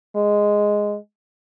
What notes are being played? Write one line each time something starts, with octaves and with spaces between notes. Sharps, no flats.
G#3